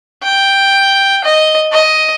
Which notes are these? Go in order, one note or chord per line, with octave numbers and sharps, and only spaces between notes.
G5
D#5
D#5